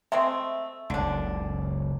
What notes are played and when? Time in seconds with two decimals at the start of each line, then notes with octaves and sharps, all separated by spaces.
0.12 G#3 A3 C4 E5
0.90 F#1 C#2 D3 D4